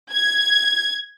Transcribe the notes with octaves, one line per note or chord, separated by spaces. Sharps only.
G#6